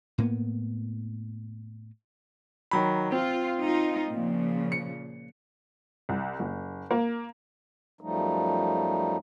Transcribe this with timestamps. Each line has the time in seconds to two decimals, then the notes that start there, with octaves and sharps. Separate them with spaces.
0.18 A2 A#3 B3
2.71 D#3 F#3 B5
3.12 C4 F4
3.61 D#4 F4
4.10 A#2 C#3 F3
4.72 C#7
6.09 C2
6.39 F#1
6.91 A#3
8.01 F#2 F3 G3 A3 D#4